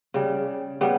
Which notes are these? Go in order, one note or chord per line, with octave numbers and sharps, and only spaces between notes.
C#3 G3
C#3 G3 B3